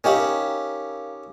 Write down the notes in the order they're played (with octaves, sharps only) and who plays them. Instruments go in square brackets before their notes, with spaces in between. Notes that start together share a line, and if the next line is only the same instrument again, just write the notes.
[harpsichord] C#4 D#4 G4 [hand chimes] A#4 F5